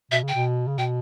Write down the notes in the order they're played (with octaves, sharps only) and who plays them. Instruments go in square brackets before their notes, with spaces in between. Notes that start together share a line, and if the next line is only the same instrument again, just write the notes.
[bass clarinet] B2 [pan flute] E5
[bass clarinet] C#3 [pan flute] G5
[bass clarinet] B2
C#3
[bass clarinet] B2 [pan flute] G5